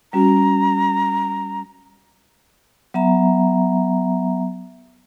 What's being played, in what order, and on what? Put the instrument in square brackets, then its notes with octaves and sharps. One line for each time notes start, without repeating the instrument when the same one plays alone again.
[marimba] G3 C#4 F#4 [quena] A#5
[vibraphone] F#3 B3 E5 A#5